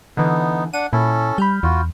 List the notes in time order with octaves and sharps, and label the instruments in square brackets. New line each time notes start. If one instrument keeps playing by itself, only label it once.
[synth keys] D3 E3 [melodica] B3 D#4
[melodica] D4 F#5 [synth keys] D#7
[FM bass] A#2 [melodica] C#4 A4 [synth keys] E4
[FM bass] G3 [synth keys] B5 F6 G6
[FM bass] E2 [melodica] F4 F#4